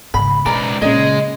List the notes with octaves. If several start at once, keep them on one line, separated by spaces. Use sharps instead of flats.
G#2 C#3 B5
C#2 B2 D5 A#5
A#2 C#3 G#3 F4 D#5